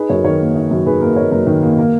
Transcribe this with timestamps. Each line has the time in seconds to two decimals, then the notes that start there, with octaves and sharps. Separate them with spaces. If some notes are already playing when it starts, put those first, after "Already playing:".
Already playing: D#4 G#4 B4
0.09 F#2 A#4 C#5
0.24 D#3 A#4 C#5
0.40 A#3
0.55 D#4
0.71 F#2
0.86 D#3 G#4 B4
1.01 A#3 A#4
1.16 D#4 A#4 C#5
1.31 F#2 A#4
1.47 D#3
1.62 A#3
1.78 A#3 A#4